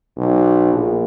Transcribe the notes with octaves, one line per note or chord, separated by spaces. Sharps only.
B1
A#1